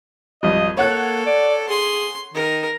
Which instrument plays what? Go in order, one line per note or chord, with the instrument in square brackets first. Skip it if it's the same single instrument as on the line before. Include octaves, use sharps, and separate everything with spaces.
[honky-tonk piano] G#1 F2 G3 [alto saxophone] D#5
[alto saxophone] A#3 [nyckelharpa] A4 [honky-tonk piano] C#5 F#5 F#6
[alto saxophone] D5
[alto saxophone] G#4 [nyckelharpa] C6
[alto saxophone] D#3 [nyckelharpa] A#4